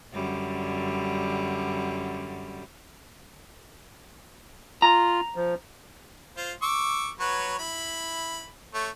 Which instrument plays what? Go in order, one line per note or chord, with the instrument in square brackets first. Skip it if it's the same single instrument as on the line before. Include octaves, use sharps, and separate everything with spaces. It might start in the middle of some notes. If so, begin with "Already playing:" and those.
[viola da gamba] F#2 D3 G3
[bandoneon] F4 [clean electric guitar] A#5
[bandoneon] F3
[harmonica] F4 C5
C#6 D6 E6
F#3 B4 C#5
E4 B5
A3 C#5